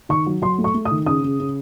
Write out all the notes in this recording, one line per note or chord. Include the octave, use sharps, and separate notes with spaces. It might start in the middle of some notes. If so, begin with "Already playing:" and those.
D#3 C#6
F#3
F#3 C6
A3
C#6
A3
D#6
D#3
C#3 D#6
C#3
C#3